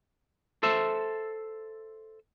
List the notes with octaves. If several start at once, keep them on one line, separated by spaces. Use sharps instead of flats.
A4 C5 E5